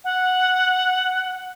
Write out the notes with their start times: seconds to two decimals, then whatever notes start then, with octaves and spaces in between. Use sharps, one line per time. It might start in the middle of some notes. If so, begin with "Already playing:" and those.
0.04 F#5